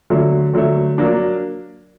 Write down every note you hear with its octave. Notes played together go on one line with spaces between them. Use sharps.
D3 F#3 A3
D3 F#3 A3
F#3 A#3 D4